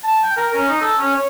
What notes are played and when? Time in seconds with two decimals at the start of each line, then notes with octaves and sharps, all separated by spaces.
0.04 A5
0.23 G5
0.37 A#4
0.54 C#4
0.68 D#4
0.81 A4
0.98 C#4
1.14 C#5